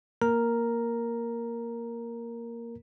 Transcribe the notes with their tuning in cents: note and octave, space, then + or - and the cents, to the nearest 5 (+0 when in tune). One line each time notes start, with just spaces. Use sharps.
A#3 +0 A#4 +0 A#5 +0